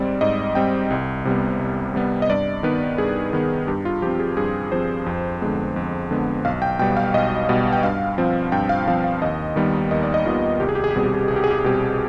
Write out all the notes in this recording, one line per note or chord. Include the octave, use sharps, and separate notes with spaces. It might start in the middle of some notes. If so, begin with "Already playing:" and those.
Already playing: G#2 G3 C4 D5
G#2 D#5
G3 C4 G5
C2
C3 G3 B3
C2
C3 G3 B3
D#5
G2 D5
D#3 B3 B4
G2 G#4
D#3 B3
G2 G4
F4
F3 C4 G4
G#4
G2 G#4
F3 C4 C5
F2
D3 G#3 B3
F2
D3 G#3 B3
B1 F5
G5
B2 G3 B3 G5
F5
B1 D#5
B2 G3 B3
G5
G2 F5
F3 C4
G2 G5
F5
F3 C4 F5
F5
D#2 D#5
D#3 G3 B3
D#2 D#5
D5
D#5
D#3 G3 B3 F4
C2 G4
G#4
G4
G#4
G4
B2 G3 C4 G#4
G4
G#4
G4
C2 G#4
G4
G#4
G4
G#4
B2 G3 C4 G4